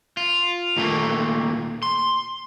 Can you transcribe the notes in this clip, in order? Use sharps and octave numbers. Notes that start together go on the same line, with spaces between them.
F4
D#2 A#2 D3 A3 A#3
C6